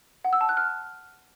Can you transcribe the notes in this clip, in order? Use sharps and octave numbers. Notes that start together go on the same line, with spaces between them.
F#5
E6
A5
F#6
F6